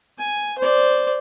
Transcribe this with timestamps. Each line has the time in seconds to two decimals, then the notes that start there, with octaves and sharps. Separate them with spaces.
0.18 G#5
0.58 C5 D5